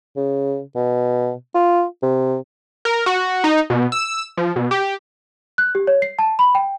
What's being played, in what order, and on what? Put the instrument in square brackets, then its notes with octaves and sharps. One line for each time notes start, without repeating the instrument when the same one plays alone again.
[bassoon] C#3
B2
F4
C3
[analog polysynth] A#4
F#4
D#4
B2
E6
F3
B2
G4
[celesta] F#6
G4
C#5
C7
A5
B5
G5